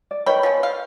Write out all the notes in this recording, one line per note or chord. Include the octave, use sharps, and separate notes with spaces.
D5
D#3 B4 C#5 G5 B5
F3 G#3 B3
F5